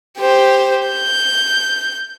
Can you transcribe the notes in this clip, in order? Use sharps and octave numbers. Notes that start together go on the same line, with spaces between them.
G4 C5
G6